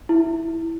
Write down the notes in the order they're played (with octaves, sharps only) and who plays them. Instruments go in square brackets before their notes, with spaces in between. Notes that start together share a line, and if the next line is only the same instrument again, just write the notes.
[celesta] E4